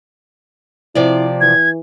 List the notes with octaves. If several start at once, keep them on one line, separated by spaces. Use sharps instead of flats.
C3 F3 E4 D5
E3 G#6